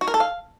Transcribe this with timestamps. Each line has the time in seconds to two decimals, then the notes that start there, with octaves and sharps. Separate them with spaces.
0.01 F#4
0.08 A#4
0.14 A4
0.20 F5